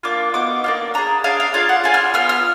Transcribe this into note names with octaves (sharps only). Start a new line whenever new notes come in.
A#3 D4 F4 D6
B3 D#4 F#4 D6
A#3 D4 F4
D4 G#4 A#5
D4 G#4 F5
F5
D4 F4 G#4 F5
F#5
D4 F4 G#4 G#5
F6
B3 F4 F6
F6